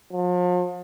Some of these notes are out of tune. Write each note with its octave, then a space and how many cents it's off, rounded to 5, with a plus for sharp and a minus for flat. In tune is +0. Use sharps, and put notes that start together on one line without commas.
F3 +40